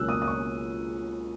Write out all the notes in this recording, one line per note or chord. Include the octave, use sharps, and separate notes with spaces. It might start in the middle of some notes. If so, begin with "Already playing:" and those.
Already playing: C#2 B2 F#3 A#3 C#4 E6 F#6
D#6
D#6
C#6